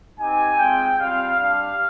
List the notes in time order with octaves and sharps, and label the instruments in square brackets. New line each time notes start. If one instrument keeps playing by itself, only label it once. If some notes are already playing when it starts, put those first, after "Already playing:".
[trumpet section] C4 D#4 G4 G#5
G#3 C4 F4 G5
G3 C4 F4 F5
G3 D4 G4 F5